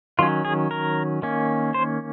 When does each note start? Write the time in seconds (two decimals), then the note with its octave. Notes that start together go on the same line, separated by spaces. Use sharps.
0.19 D#3 F#3 C#4 F4
0.45 G#4
0.71 A#4
1.22 D#3 A#3 C#4
1.74 C5